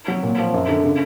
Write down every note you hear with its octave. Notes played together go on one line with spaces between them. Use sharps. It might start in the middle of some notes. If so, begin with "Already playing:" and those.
F#3
A#2
F3
F#2
D3
C#3